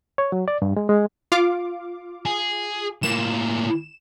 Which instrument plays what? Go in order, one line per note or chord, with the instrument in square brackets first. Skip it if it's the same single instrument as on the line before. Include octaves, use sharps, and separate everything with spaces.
[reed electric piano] C#5
F#3
D5
G2
G#3
G#3
[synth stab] F4 F5 D6
[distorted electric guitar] G#4
[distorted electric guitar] A2 A#3 [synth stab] E7